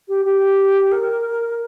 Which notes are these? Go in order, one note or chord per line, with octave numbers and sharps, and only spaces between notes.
G4
G4
A#4